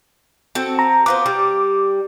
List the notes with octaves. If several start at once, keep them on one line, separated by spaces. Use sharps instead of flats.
C4 F#4 A4
A#5
B3 F4 C5 D6
G3